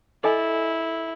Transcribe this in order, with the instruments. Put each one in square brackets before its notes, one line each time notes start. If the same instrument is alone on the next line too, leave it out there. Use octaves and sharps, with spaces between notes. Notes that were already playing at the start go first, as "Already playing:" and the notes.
[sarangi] E4 [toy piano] A4 D#5 G#5